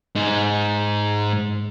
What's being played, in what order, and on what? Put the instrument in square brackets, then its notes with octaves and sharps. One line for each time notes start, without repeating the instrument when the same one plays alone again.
[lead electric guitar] G#2 D#4